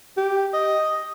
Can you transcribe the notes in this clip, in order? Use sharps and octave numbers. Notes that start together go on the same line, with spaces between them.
G4
D#5